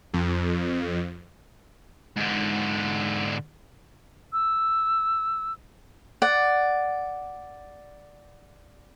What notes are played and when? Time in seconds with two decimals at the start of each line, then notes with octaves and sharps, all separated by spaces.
0.14 F2
2.17 G#2 D3
4.33 E6
6.22 D5 F#5